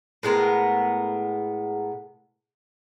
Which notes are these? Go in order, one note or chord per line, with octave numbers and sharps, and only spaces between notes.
A2 G#3 B3 A#4